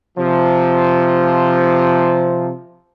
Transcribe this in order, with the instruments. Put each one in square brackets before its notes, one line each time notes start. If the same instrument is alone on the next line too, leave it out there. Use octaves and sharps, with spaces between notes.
[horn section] C3 F3